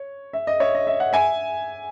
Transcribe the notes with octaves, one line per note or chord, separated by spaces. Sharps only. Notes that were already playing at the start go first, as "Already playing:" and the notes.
Already playing: C#5
E5
D#5
C#5 E5
D#5
E5
F#5
E5 G#5